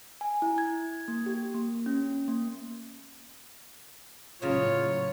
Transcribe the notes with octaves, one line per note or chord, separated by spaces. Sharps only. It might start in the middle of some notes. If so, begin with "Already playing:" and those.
G#5
E4
G#6
A#3
G4
A#3
C#4
A#3
A2 C#3 F#3 A#3 F4 C#5